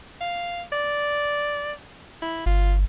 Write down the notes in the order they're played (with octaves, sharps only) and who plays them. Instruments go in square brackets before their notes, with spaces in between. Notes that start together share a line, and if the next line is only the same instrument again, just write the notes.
[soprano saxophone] F5
D5
E4
[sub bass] G1 [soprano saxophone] F4